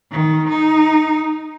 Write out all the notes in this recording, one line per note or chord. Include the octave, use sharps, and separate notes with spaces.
D#3
D#4